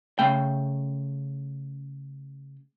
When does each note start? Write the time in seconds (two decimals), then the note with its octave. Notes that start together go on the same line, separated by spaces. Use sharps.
0.19 C#3 A3 G5